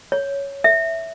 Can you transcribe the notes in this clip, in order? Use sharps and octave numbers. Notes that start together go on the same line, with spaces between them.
C#5
E5